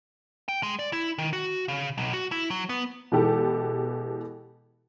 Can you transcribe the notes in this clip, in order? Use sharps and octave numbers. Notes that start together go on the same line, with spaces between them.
G5
G#3
D5
E4
D#3
F#4
C#3
B1
F#4
E4
F#3
B3
B2 E3 G#3 G4 A4